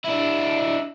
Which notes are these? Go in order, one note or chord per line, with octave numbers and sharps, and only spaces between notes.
D4 E4